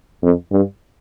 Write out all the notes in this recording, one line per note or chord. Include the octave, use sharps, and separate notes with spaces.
F2
G2